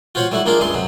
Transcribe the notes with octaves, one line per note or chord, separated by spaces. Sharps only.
F4 F#4 C5 C#5 F#5
G3 A3 E4 F#4
A#3 D4 D#4 F4 G#4 A#4
C#2 G2 G#3 E5 C6
F#2 C3 F#3